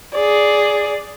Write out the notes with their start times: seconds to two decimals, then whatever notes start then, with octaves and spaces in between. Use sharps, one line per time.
0.14 G#4 D5